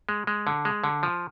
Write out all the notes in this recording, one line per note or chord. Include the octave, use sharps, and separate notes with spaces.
G#3
G#3
D3
G#3
D3
F3